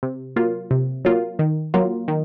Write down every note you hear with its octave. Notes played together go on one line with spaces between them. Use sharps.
C3
F#3 A#3 F4
C3
F#3 A#3 F4
D#3
F#3 A#3 F4
D#3